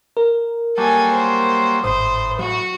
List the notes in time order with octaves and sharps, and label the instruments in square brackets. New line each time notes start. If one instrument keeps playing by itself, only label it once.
[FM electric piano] A#4
[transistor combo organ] F#3 G3 A#3 [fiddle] A4 G#5
[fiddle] C5
[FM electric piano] G#1 D#6 [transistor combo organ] A2 [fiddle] C5
[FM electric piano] F#3 [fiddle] F#4